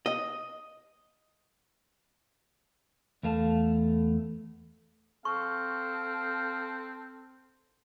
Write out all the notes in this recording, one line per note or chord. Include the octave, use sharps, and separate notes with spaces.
D#5
E2 A3 F5 A5
C4 A4 F5 C#6